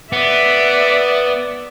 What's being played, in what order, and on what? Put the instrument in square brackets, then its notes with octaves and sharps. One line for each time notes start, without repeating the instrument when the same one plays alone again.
[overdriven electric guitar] B3 [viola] D5 E5